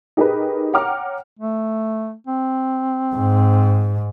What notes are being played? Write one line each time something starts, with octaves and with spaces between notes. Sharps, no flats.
D#4 G4 G#4 A#4 B4
C#5 F#5 G5 A#5 D6 F6
A3
C4
G#2